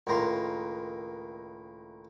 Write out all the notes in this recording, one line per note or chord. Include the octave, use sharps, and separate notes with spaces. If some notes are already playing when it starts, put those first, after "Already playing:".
C#2 A2 D#3 A#3 A#5 C6